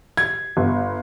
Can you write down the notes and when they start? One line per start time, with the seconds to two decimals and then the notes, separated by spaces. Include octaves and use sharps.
0.17 G#6
0.57 G1